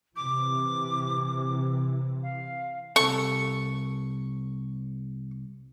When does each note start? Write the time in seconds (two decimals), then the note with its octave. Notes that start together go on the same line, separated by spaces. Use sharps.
0.15 C3 E3 D6
2.22 F5
2.96 C2 A4 C#6